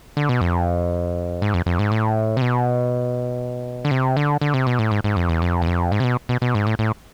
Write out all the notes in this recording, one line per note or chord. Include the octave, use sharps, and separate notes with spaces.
D3
B2
F2
G#2
F2
F2
G#2
A2
C3
B2
D3
C3
D3
D3
C3
B2
A2
G#2
G#2
F2
E2
F2
E2
F2
G#2
C3
B2
B2
B2
G#2
A2
A2